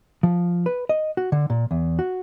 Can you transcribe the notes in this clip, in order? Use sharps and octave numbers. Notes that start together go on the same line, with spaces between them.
F3
B4
D#5
F#4
D3
A#2
E2
F#4